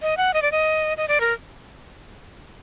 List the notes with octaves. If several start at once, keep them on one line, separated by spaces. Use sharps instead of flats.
D#5
F#5
D#5
D5
D#5
D#5
D5
A#4